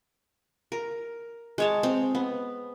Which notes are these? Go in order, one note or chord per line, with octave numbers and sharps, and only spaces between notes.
A#4
G#3 C#5 A5
C4
B3